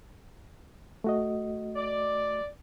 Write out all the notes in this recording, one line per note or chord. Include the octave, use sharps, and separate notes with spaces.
A3 F#4 D#5
D5